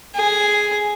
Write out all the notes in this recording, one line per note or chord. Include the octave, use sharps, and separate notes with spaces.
G#4